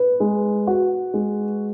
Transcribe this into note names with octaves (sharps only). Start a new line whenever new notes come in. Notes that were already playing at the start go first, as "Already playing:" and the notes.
Already playing: B4
G#3
F#4
G#3